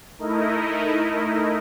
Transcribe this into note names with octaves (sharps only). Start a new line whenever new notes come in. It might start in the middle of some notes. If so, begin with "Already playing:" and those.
A3 D#4 E4 A#4 D#5